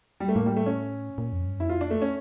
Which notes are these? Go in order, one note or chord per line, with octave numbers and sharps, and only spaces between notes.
G3
A3
A2 A#3
G3
A3
C#4
A#2
F2
G2
F2 E4
F4
D4
A3
C#4